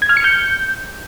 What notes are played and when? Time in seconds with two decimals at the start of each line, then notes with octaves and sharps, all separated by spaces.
0.02 G#6
0.09 F6
0.17 C#7
0.24 G6